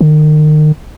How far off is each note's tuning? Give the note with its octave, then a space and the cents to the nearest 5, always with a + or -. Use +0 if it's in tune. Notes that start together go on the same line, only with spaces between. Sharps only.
D#3 -35